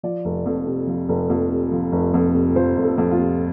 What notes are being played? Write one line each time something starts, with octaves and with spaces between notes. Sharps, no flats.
F3 D5
F1
F2
C3
F3
F1
F2
C3
F3
F1
F2
C3
F3 C5
F1
A4
F2
F4
C3